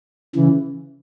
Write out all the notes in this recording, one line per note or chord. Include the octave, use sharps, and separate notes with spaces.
C#3 E3